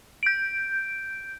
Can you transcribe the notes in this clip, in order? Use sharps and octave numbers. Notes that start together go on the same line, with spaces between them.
G6 D7